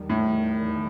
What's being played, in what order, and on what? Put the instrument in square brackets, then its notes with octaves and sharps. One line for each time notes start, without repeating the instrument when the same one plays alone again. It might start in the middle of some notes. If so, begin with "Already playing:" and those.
Already playing: [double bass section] E2 D#3 G3
[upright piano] A2